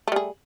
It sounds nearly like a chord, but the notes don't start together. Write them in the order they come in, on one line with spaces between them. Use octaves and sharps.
A3 G3 G#4